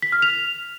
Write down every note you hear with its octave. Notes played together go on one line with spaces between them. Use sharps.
B6
F6
F7